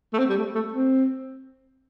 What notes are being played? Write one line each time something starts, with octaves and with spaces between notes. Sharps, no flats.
A3
C4
G3
A3
A3
C4